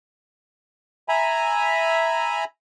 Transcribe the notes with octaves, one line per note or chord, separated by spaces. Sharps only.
E5 G#5 A#5 B5